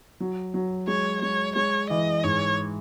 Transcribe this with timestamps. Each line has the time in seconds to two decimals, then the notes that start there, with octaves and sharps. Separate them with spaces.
0.20 F#3
0.54 F#3
0.87 G#3 C#5
1.22 G#3 C#5
1.56 G#3 C#5
1.90 E3 D#5
2.23 G#2 C#5